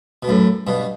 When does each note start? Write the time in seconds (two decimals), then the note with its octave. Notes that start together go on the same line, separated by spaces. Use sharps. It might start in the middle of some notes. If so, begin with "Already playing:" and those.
0.23 B2
0.28 F#2 A2
0.67 G2 B2